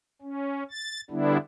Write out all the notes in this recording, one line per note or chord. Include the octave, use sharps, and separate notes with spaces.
C#4
A6
D3 G3 B3 D4 E4